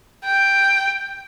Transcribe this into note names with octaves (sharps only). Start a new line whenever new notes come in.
G5